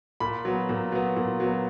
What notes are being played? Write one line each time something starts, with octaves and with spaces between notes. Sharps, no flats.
A#2 B5
F#3 B3
A#2
F#3 B3
A#2
F#3 B3